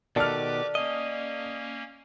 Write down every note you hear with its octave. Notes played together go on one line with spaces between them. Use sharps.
B2 D#3 G4 A4 B4 D5 D6 F6
A#3 C#4 D#5